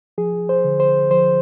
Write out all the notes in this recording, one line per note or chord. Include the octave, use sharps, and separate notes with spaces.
F3 G#4
C5
D3
C5
F3 C5